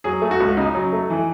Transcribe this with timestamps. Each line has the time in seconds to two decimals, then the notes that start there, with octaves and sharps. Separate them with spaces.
0.04 F#3 G#4
0.22 A3
0.31 F#4
0.40 C#2
0.57 C#3 D#4
0.75 F#3
0.93 A3
1.10 E3